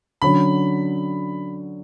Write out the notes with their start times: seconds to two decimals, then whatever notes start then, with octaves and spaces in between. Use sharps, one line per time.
0.22 D3 F#3 C#4 B5